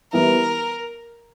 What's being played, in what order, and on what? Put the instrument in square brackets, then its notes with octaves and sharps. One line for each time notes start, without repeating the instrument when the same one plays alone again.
[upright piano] E3 G3 B3 E4 [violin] A#4